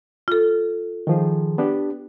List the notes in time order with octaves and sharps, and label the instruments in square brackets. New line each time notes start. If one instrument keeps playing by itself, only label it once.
[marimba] F4 A4
[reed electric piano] D#3 F3 G#4
B3 D4 G4